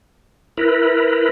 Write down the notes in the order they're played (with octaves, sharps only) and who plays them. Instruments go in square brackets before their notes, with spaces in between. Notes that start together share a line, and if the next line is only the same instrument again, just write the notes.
[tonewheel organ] E4 A#4 B4